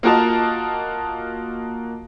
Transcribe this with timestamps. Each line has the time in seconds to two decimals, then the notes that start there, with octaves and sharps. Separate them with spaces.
0.03 A#3 F4 F#4 A#4 D#5 A5